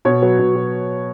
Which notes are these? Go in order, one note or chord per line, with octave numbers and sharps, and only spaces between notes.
B2 C#5
F#3 B4
B2
F#3